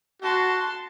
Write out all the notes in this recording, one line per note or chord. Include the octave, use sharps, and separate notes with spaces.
F#4 A5 C6